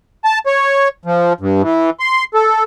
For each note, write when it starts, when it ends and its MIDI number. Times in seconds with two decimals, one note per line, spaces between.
0.25 0.39 81
0.46 0.88 73
1.05 1.33 53
1.40 1.62 43
1.62 1.90 52
2.00 2.24 84
2.34 2.64 69